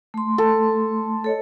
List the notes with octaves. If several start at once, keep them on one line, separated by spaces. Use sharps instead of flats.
A3 C6
A4
A4 C#5 D#5